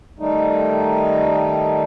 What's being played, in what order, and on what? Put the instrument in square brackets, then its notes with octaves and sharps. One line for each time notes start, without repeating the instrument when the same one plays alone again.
[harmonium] D#3 G3 A3 D#4